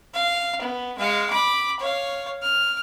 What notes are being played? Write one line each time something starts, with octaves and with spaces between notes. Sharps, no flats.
F5
B3
G#3 F5
B5 D6
C#5 F5
F6